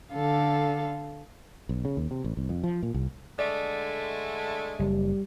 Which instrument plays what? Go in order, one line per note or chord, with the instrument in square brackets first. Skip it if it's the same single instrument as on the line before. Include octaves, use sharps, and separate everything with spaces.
[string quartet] D3 A4 F5
[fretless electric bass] B1
C#3
D#2
C3
A1
C2
F2
F3
A#2
C2
[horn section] D3 G#3 A3 [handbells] D5
[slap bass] F#1 [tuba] G3